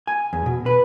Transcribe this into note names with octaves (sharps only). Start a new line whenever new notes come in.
G#5
E2
B2
B4